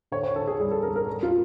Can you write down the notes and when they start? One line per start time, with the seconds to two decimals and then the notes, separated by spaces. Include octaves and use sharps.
0.12 D3 C#5
0.23 C#5
0.36 D3 A4
0.47 G#4
0.60 G3 G#4
0.71 A4
0.83 D3 A#4
0.96 A#4
1.07 G3
1.23 F4